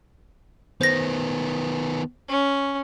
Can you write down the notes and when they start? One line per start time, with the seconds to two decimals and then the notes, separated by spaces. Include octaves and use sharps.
0.81 D#3 B3 C5 A#6
2.28 C#4